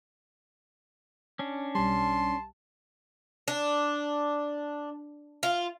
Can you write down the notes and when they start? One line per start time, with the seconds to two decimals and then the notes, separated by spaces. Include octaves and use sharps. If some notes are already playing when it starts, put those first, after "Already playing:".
1.39 C#4 D4
1.75 B1 G3 A5 C6
3.48 D4
5.43 F4